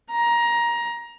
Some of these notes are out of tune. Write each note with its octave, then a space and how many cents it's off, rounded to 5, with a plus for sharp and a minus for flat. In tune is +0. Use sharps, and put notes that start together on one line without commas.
A#5 +20